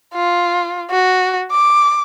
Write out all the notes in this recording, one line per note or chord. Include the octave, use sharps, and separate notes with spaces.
F4
F#4
D6